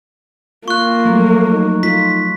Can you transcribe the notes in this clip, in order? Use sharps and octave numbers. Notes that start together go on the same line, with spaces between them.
A#3 F4 C#6 F#6
F3 F#3 A3
D#4
F4 B6